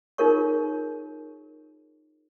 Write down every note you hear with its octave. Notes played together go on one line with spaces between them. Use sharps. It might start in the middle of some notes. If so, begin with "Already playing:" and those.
D#4 F4 G#4 A#4 C#5 C#6